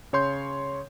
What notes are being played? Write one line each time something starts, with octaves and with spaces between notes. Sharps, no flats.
C#3 C#5 C6 G6